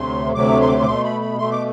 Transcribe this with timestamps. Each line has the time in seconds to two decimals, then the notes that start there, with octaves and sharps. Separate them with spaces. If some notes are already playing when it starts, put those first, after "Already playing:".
Already playing: D2 C3 F#3 A3 C6
0.34 D2 C3 F#3 A3 D6
0.61 C6
0.68 D6
0.75 C6
0.82 D6
0.86 B2 A3 C6
1.04 B5
1.21 B5
1.38 B2 A3 C6
1.51 D6